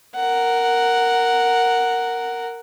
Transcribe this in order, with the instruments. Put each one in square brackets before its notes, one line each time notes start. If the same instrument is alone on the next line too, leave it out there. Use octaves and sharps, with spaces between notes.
[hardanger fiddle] A#4 F#5